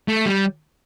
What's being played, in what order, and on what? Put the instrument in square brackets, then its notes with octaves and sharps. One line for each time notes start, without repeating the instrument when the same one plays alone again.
[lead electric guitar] A3
G3